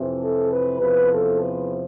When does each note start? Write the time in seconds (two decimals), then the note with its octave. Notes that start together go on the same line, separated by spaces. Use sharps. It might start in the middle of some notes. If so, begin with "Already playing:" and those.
Already playing: F2 C3 E3
0.19 A4
0.49 B4
0.78 E2 C3 F3 B4
1.08 A4
1.39 B4